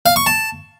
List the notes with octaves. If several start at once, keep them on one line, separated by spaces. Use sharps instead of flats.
F5
C#6
A5